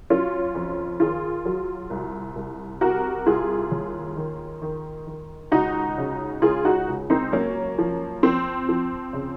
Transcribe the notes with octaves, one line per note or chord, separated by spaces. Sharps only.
F#3 C#4 F4
F2
D#3 F4 G#4
F#3
C2
C2
C3 F#4 A#4
C2 F4 G#4
D#2
D#3
D#3
D#3
C#2 D#4 F#4
C#3
C#2 F4 G#4
D#4 F#4
C#2
C4 D#4
F#2 A#3 C#4
F3
F3 C4
F3
C#3